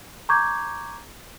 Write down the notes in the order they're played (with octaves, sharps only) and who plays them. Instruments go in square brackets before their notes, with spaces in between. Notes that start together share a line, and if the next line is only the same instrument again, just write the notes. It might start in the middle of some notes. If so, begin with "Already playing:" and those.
[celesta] A#5 C#6 D6 G6 G#6